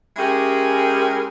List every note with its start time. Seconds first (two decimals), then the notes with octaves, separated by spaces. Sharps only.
0.17 G#3 C#4 E4 G4 G#4 A#4